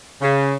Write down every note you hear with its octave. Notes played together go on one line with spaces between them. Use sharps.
C#3